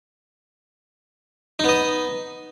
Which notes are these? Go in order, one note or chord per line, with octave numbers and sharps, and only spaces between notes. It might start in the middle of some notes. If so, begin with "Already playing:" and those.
B3 D#4 D#5